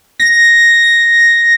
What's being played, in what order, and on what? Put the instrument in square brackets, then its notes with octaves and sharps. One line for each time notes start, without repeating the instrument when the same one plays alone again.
[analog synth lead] A#6